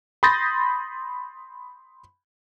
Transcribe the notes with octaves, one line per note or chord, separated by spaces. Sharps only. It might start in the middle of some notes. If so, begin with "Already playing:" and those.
B5 C6 D#6 G6 A6 A#6